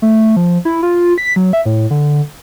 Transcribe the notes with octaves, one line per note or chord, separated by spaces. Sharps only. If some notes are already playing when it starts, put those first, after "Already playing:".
A3
F3
E4
F4
B6
F#3
E5
A2
D3